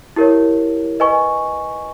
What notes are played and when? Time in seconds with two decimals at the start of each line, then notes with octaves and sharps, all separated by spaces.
0.16 E4 G4 A#4 C#5
1.00 B4 D#5 G#5 C#6